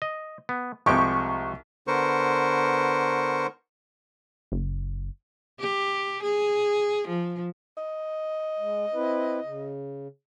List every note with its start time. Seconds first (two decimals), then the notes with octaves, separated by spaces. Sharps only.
0.02 D#5
0.49 B3
0.86 C2 F3 G#3 G4 C#6
1.87 D3 B3 A#4 C5 C#6
4.52 F#1
5.60 G4
6.23 G#4
7.08 F3
7.77 D#5
8.59 G#3
8.94 C4 E4 B4
9.44 C#3